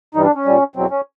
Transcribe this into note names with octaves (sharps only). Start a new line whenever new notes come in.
G2 E3 G3 D#4
D4
C#4
A#2 G3
E2 B2 F#3 C4
C#4